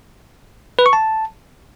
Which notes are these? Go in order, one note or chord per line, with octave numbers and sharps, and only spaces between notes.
B4
C#6
A5